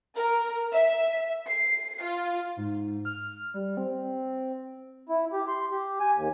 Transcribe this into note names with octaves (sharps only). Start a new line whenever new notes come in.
A#4
E5
C7
F4
G#2
F6
G3
C4
E4
G4
C6
G4
G#5
D#2